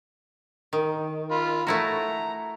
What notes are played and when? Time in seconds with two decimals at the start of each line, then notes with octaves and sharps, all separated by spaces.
0.73 D#3
1.31 F4 B5
1.67 A3 E4 F#4 A#5